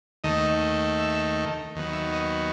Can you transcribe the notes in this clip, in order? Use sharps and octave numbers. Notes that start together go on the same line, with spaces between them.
D#2 D#3 A3 D#5
E5
D#2 D#3 F#3 B3
E5
D#5